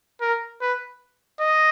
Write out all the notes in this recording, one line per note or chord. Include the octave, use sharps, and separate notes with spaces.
A#4
B4
D#5